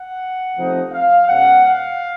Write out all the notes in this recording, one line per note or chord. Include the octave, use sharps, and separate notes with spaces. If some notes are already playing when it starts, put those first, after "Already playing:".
Already playing: F#5
C3 F3 A3 C4 D#4
F5
B2 G#3 C#4 F#5
F5